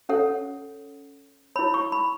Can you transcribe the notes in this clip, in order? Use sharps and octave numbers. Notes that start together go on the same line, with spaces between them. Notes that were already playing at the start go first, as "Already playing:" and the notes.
C#4 A4 C#5 F#5
E4 C#5 B5
C#6
B5